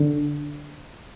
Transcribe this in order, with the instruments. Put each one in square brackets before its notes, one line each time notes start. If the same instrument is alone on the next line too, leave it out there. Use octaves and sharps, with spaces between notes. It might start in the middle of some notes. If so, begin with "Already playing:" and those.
Already playing: [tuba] D3